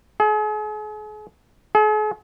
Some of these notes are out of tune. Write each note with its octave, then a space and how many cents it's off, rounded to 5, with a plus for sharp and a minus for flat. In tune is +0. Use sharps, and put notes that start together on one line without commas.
G#4 +40
G#4 +45